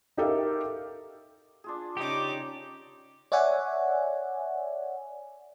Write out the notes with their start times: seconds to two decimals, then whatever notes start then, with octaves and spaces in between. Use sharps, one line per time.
0.17 D#4 G4 A4 A#4 E5 F5
1.64 D4 F4 G#4
1.97 C#3 D#4 G4 C#5 D5 D6
3.32 C#5 D5 E5 F#5 G#5